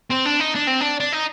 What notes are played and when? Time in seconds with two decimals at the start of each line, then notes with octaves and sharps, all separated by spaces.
0.10 C4
0.25 D4
0.40 D#4
0.55 D4
0.67 C4
0.81 D4
1.00 D4
1.13 D#4